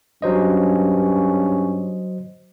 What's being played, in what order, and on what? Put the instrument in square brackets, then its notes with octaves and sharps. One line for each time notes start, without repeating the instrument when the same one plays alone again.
[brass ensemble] G2 C#4 [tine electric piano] F#3 C5 D#5